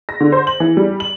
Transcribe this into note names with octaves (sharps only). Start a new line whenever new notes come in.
A#6
D3
C5
F#7
E3
G3
F#7